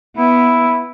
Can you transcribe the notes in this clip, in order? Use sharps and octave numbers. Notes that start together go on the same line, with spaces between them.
B3 E4